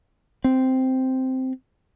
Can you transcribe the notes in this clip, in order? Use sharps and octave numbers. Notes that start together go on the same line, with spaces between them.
C4